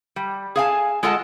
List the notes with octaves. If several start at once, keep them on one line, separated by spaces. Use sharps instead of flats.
G3
G#4 F5 G#5 A5
G#3 F4 A4 D#5 F#5 A5